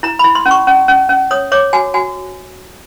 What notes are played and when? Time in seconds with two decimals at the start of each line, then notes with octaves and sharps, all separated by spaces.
0.03 E4 A#5
0.19 E4 B5
0.35 C6
0.46 C#4
0.51 C#6
0.67 C#4
0.88 C#4
1.09 C#4
1.31 C#5 D#6
1.52 C#5 D6
1.73 F#4 G#5
1.94 F#4 G#5